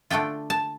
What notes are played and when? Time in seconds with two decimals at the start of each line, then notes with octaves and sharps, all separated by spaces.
0.10 D3 A3 D4 F4 G5
0.50 A5